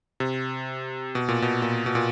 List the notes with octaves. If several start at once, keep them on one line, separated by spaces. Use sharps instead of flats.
C3
B2
A#2
B2
A#2
B2
A#2